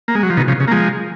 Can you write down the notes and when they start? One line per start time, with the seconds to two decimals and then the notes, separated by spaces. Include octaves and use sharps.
0.08 A#3
0.15 G#3
0.23 F#3
0.30 F3
0.37 B2 D#3
0.48 C#3 F3
0.60 C#3
0.68 A#3
0.71 F3 G#3